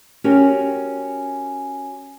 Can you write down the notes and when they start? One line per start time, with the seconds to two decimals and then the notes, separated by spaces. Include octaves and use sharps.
0.24 C#4 F#4 G4 A#4